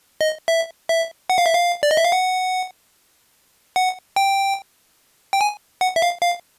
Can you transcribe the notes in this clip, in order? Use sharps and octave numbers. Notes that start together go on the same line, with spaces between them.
D#5
E5
E5
F#5
F5
E5
F5
D5
D#5
E5
F5
F#5
F#5
G5
G5
G#5
F#5
E5
F5
F5